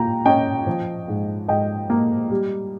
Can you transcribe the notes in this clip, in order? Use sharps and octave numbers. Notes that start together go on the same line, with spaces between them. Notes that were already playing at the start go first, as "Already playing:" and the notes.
Already playing: A#2 G5 A#5
C#4 D#5 G5
F3
G#2
G#2 D#5 G5
A#3
G3